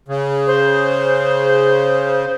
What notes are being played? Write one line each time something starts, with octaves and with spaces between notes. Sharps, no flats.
C#3
C5